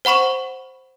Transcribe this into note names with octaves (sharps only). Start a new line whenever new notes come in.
C5 F#5 B5 C#6 E7